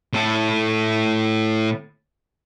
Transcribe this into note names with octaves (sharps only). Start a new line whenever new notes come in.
A2 A4